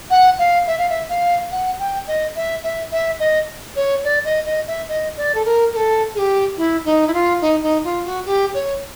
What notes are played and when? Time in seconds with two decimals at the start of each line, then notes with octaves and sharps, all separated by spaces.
0.10 F#5
0.38 F5
0.67 E5
0.78 F5
0.89 E5
1.09 F5
1.51 F#5
1.79 G5
2.07 D#5
2.35 E5
2.63 E5
2.91 E5
3.19 D#5
3.76 C#5
4.04 D5
4.25 D#5
4.46 D#5
4.67 E5
4.88 D#5
5.17 D5
5.34 A4
5.45 A#4
5.73 A#4
5.76 A4
6.15 G#4
6.18 G4
6.57 E4
6.85 D#4
7.07 E4
7.13 F4
7.41 D#4
7.63 D#4
7.84 F4
8.05 F#4
8.25 G4
8.54 C#5